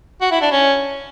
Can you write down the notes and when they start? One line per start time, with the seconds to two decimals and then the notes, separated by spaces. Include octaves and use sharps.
0.21 F#4
0.31 E4
0.42 D4
0.52 C#4